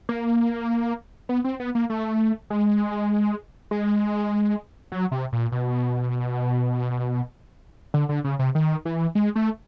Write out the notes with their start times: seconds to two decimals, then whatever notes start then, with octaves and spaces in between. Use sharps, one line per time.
0.09 A#3
1.29 B3
1.44 C4
1.60 B3
1.75 A#3
1.90 A3
2.50 G#3
3.71 G#3
4.92 F#3
5.11 C3
5.33 A#2
5.52 B2
7.94 D3
8.09 D3
8.24 C#3
8.39 C3
8.55 D#3
8.85 E3
9.15 G#3
9.35 A3